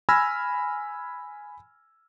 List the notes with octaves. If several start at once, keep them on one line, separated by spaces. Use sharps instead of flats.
G#5 B5 E6 F6 G#6 A#6